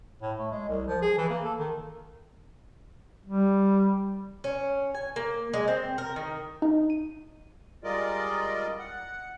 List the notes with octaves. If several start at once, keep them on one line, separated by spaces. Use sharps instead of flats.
A2
A3
G#3
C2
F3
G#4
E3
A#3
A4
D#3
G3
C#4
G#5
A#3
G#3
C4
A#4
D#3
D#4
D#7
G3 G#3 F4 A#4 D5 D#5
F#5